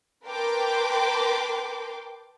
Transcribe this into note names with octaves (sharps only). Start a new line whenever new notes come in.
A#4 B4 G5 A5 C6 D6